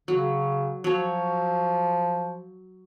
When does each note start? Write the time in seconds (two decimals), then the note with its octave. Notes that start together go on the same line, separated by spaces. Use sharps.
0.08 C#3 F#3
0.84 F3 F#3 C#5